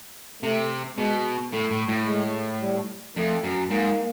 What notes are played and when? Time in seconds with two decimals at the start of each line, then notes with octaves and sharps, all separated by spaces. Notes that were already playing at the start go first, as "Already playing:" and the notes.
0.42 C3 A3
0.98 B2 G#3
1.52 A2 A3
1.71 A2
1.89 A2
2.06 G#3
2.61 G3
3.16 F2 A3
3.44 F#2
3.70 G#2 A#3